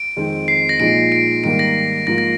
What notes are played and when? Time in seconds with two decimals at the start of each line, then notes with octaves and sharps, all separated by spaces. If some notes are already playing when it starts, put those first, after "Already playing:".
Already playing: D7
0.16 F2 D#3 G#3 C4
0.48 C7
0.69 A#6
0.80 A#2 F3 G#3 D#4 D7
1.12 D7
1.44 G#2 D#3 G3 A#3 D7
1.59 A#6
2.07 G#2 F3 A#3 A#6
2.18 A#6